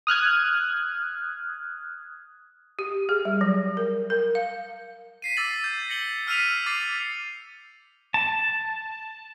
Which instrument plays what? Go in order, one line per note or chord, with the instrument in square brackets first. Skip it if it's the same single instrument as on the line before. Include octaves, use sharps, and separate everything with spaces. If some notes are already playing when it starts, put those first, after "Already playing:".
[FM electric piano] D#6 F6 F#6 G#6
[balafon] G4
G#4
G3
F#3
A#4
A#4
F5
[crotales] B6 C7 D#7
D6 E6 A6 F#7
G6
A#6 C#7 F#7 G7
E6 F6 B6 C7 D#7 F7
D6 A6 C7
[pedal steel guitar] A5